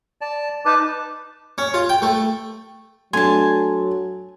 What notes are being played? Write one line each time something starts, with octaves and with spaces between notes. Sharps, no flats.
D5 A5
D#4 B4 A5 D6
C#4
F4
G5
A3
F#3 A3 D4 G#5 A5 C6